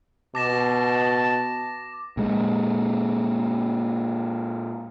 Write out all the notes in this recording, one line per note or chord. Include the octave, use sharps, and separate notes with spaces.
B2 A5 D6 A#6 E7
A#2 G#3